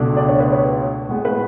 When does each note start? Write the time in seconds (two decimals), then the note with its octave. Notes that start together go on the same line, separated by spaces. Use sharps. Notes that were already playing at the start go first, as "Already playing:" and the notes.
Already playing: C#2 B2 A3 D4
0.17 D5
0.29 C#5
0.40 B4
0.52 C#5
1.09 A2 G#3 B3
1.25 B4